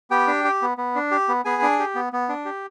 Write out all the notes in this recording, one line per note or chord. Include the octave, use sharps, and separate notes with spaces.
B3 G4 G5
D4
G4
B3
B3
D4
G4
B3
B3 G#4 G#5
D4
G4
B3
B3
D4
G4